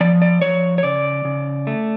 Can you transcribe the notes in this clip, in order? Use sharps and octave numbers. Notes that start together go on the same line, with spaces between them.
F3 D5
D5
F3 C#5
C#5
C#3 D5
C#3
A3